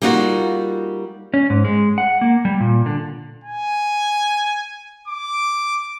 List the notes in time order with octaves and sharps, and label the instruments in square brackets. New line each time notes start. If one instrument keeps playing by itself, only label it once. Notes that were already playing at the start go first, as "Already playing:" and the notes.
[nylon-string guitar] G3 A#3 D#4 F4 F#4
[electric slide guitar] C#4
G#2
G#3
F#5
A#3
G3
A#2
D3
[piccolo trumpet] G#5
D6